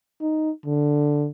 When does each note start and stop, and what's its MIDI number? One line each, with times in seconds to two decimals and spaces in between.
0.21 0.51 63
0.66 1.28 50